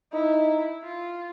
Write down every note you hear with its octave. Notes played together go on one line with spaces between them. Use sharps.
D#4 E4
F4